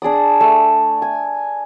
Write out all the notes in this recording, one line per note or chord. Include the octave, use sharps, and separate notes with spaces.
D4 G#4 D5 D#6
A3
G#5